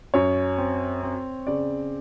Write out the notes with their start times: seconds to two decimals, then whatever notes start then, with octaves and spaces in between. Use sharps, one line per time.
0.14 F#2 C#5
0.58 C4
1.03 C4
1.47 C#3 D5